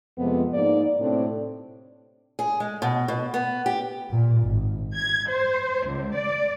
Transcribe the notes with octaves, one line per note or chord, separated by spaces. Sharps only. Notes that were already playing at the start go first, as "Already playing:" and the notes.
F2 C3 F3 G#3 B3
G#2 A#3 D#4 D5
A2 C3 C4 D4
G#4
G#3
B2
B2
B3
G4
A#2
G#1
G#6
C5
C#2
D5